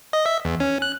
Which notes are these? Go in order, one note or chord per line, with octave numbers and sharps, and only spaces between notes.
D#5
E5
E2
C#4
F#6